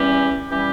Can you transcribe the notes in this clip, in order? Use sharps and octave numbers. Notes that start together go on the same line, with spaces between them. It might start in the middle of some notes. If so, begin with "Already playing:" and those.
Already playing: E2 E3 G3 C#4 G4
E3 G3 C#4 G4